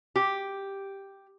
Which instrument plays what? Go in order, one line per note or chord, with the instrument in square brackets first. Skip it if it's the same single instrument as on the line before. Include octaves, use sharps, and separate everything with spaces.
[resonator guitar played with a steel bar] G4